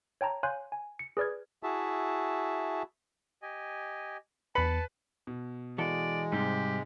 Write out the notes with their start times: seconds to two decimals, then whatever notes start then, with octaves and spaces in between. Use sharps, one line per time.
0.21 C#5 G5 A5 A#5
0.43 C#5 F5 G#5 C6 F#6 G6
0.72 G#5
0.99 C#7
1.17 G#4 B4 D5 F6 G#6
1.63 E4 F#4 G#4 E5 A5
3.42 G4 D#5 G#5
4.55 E2 B4 A5 B5 C#7
5.27 B2
5.78 E3 G#3 F#4 A4 D5
6.32 G#2 C3 G3 G4